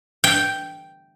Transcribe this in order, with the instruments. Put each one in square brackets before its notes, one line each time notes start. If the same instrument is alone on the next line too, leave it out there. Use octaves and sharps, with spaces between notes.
[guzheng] G5